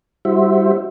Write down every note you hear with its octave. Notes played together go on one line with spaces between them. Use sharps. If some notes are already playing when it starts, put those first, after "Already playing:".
G3 E4 F#4 C5 E5